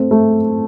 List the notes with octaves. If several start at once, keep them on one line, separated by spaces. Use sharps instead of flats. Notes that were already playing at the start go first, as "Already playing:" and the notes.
Already playing: A3 C4
A3